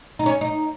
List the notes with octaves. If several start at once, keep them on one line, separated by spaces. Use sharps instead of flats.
D#4
C#4
D#4